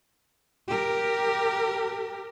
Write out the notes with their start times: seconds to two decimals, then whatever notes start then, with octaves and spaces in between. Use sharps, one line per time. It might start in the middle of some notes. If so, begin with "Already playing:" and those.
0.67 G4 A#4